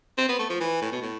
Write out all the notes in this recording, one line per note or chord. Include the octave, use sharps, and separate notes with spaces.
C4
B3
A3
F3
E3
A2
B2
A2